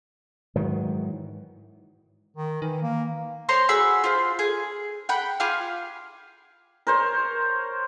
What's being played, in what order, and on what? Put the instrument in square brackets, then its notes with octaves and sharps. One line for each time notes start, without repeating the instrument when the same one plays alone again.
[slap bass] G#2 D#3 E3 F#3
[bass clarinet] D#3
[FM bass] D#3 [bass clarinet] E3
[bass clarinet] A#3
[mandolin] C5 C#5 A#5 C6
F#4 G#4 B5 E6
F4 C5
G#4
F#5 G5 B5
F4 G4 G#4 F5
[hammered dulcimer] A#4 C5 C#5